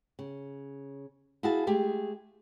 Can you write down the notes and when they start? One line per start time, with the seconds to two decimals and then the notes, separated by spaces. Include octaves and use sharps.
0.19 C#3
1.43 E4 F#4 G#4 F5 A5
1.67 G#3 A3 G4 G#4